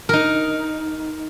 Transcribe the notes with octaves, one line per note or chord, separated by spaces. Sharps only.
D#4 A#4